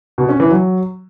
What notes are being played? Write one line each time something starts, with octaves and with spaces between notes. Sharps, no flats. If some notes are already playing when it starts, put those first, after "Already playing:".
B2
C#4
E3
F#3